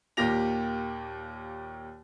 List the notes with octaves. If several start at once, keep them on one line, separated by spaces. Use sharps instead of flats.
D#2 A#2 A#3 G4 A#6 F7